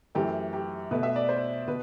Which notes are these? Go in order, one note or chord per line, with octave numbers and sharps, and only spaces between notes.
F#2 E3 A3 G4
G4
B2 A3 B4
E5
D5
C5
B2 B4